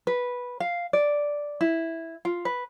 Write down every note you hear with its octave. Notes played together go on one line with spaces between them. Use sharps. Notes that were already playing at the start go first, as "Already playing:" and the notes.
B4
F5
D5
E4
F4
B4